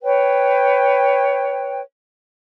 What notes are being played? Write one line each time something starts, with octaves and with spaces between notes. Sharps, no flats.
B4 C#5 G5